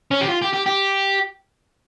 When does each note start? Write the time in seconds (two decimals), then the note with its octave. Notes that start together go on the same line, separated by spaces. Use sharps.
0.11 C#4
0.21 G4
0.29 F4
0.42 G4
0.53 G4
0.66 G4